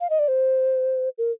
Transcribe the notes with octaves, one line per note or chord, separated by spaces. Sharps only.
F5
D#5
D5
C5
A#4